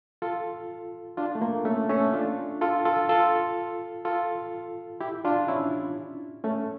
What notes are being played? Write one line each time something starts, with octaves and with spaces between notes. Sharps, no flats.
F4 A4
D4 F4
A3
A#3
A3 C#4
A3 C#4
D4 F4
F4 A4
F4 A4
F4 A4
F4 A4
E4 G4
D4 F4
C#4 E4
A3 C#4